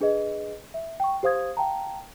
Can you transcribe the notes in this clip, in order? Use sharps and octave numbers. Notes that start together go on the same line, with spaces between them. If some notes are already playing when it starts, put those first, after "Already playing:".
D4 G#4 B4 D#5
E5
G5 C#6
G4 C5 F5 D#6 G#6
F5 G5 A5 A#5